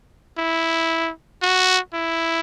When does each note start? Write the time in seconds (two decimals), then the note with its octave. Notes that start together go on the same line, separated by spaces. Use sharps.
0.38 E4
1.42 F#4
1.94 E4